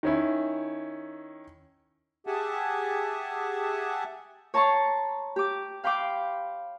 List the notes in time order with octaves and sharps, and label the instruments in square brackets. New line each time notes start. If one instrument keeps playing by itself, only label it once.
[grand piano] D#3 C#4 E4
[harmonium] G4 G#4 E5 F#5 G#5 A5
[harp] C#5 A5 A#5 C6 C#6
G4 D6
F5 G5 B5 C6 D6